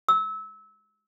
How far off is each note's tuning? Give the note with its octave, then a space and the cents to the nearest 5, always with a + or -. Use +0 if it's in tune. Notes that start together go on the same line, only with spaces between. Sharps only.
E6 -25